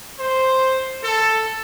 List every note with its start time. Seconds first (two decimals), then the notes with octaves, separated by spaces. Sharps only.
0.20 C5
1.04 A4